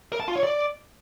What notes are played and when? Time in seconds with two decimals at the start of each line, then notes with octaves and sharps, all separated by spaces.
0.12 A#4
0.20 A5
0.28 F4
0.36 C#5
0.43 D5